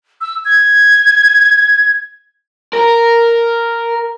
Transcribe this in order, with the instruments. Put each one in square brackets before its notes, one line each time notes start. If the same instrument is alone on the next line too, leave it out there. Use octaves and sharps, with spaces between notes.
[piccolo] E6
G#6
[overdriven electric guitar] A#4